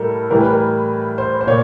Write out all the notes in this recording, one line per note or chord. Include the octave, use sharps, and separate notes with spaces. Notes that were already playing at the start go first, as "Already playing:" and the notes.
Already playing: A2 G3 A4 A#4
A2 E3 G3 A#4
B4
A#4
C5
C5
A#2 C#5